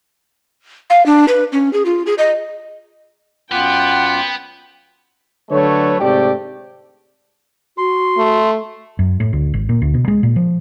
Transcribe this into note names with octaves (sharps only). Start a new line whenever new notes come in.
F5
D4
B4
C#4
G#4
F4
G#4
D#5
F#2 B3 F4 F#5 G5 D6
D3 F#3 A3 B4 C#5
G#2 C3 A3 G4 D5 G5
F#4 C6
A3
F#2
A2
D2
G#1
A#2
D2
B2
G#3
A#2
F3